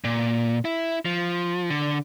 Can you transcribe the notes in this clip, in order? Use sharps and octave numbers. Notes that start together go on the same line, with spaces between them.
A#2
E4
F3
D3